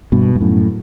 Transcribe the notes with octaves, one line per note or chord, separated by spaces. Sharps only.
G2 B2
G2
F#2 A2